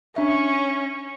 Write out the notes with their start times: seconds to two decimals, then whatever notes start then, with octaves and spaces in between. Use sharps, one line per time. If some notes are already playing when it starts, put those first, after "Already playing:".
0.16 C#4 D4 E5 C#6